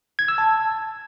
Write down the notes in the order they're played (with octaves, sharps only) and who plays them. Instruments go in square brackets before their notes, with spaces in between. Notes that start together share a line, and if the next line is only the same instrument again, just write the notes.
[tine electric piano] G#6
E6
A5